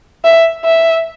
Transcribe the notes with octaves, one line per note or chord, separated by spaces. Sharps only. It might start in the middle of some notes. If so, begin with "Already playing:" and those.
E5
E5